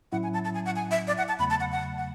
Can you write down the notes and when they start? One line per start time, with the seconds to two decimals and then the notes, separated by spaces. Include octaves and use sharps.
0.12 A2 F#3 C#4 E4 F#5
0.23 G#5
0.33 A5
0.45 A5
0.54 G#5
0.66 F#5
0.76 G#5
0.91 E5
1.07 D5
1.18 F#5
1.28 A5
1.39 E2 C#3 F#3 A3 B5
1.50 A5
1.60 F#5
1.72 F#5
1.98 F#5